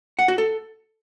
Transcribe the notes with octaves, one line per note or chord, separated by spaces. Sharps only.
F#5
F#4
A4